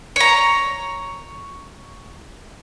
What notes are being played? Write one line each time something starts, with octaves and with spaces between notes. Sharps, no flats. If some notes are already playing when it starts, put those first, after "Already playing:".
C#5 A#5